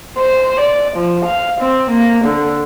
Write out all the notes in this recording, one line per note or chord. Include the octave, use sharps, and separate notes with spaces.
C5
D5
F3
F5
C4
A#3
D3